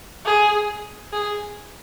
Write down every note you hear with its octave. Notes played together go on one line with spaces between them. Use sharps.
G#4
G#4